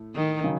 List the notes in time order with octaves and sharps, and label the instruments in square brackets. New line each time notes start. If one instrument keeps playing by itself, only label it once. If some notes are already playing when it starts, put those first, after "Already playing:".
Already playing: [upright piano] A2 A3
[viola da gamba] D#3
[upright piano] C#3 F#3